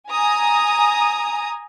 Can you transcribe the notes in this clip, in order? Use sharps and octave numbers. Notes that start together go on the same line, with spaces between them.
G#5 A#5 D#6